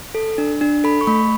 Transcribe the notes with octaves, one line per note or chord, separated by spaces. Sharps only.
A4
D4
D4
A4 B5
C#6
A3 B5